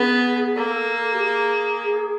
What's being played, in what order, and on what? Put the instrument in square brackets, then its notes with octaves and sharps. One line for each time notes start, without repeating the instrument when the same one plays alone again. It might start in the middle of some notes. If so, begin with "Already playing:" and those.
Already playing: [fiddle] B3 [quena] G#4
[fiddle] A#3 [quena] A4
[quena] G4
G#4